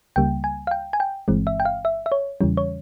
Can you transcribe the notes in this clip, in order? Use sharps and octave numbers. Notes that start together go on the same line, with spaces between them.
C#2 C#3 G3 A#3 G5
G#5
F5
G5
G#5
G5
G1 G2 E3 G#3 C4
E5
G5
F5
E5
E5
C#5
E2 C#3 E3 G3 C#4
C#5